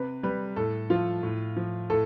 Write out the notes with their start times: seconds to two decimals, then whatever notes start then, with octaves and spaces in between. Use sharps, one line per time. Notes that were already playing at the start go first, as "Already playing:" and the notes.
Already playing: C3 B4
0.23 G3 B4
0.56 A2 A4
0.90 F3 F4
1.23 A2
1.56 F3
1.90 A2 A4